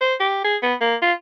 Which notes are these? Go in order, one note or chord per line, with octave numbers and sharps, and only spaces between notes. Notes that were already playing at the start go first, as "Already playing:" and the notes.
C5
G4
G#4
B3
A#3
F4